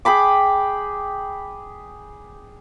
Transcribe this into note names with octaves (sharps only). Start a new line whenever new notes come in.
G#4 G5 B5 D6